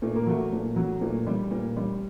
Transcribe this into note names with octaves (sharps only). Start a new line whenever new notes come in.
A#2 A3
A#3
F#3 A3
A#2
F#3
A#2 A3
G3
A#2
G3